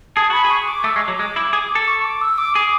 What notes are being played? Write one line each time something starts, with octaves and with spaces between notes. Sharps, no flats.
G#4 A5
F#4 B5
G#4
C#6
D6
A3 E6
G#3 C#6
D6
F#3
G#3
E4
G#4
A4
C#6
D6
E6
D6
G#4 D6